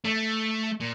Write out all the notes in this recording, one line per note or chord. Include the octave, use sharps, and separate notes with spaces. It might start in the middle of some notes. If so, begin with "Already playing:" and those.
A3
A#2